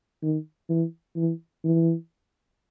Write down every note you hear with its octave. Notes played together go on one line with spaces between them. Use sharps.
D#3
E3
E3
E3